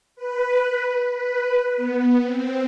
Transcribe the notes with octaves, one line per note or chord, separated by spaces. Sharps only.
B4
B4
B3
C4